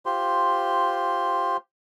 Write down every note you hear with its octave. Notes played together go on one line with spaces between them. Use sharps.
F4 G4 C5 C6